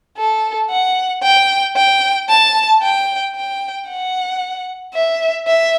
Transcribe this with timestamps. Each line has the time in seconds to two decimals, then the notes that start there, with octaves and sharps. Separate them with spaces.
0.17 A4
0.70 F#5
1.23 G5
1.76 G5
2.29 A5
2.82 G5
3.35 G5
3.89 F#5
4.94 E5
5.48 E5